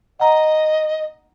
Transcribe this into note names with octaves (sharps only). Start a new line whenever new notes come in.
D#5 F#5 A#5